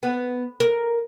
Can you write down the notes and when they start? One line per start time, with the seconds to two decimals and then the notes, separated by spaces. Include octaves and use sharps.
0.03 B3
0.60 A#4